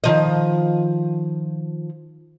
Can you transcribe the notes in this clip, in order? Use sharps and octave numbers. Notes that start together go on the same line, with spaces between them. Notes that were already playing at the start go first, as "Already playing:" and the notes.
D#3 F3 D#5